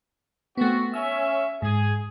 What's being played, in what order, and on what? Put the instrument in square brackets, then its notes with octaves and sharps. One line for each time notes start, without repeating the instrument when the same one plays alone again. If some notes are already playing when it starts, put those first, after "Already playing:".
[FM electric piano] A3 B3 [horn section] C4 F#4
[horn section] C#4 E5 [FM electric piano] E6
[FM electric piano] G#2 [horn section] G#4